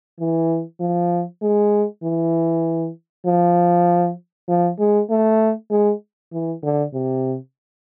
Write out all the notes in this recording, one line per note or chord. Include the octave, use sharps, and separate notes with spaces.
E3
F3
G#3
E3
F3
F3
G#3
A3
G#3
E3
D3
C3